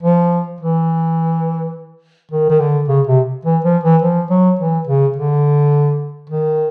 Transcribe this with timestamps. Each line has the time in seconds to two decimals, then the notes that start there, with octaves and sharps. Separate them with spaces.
0.03 F3
0.61 E3
2.31 D#3
2.50 D#3
2.60 D3
2.88 C#3
3.07 C3
3.45 E3
3.64 F3
3.84 E3
4.02 F3
4.30 F#3
4.59 E3
4.87 C#3
5.16 D3
6.30 D#3